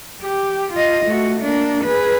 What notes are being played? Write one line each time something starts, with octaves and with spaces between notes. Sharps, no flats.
G4
F4 D#5
A3 F#4
A#3 D4
G#4 B4